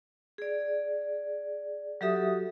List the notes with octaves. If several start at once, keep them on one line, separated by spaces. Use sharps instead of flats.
G#4 D5
F#3 F#4 G4 A4 E5 D#6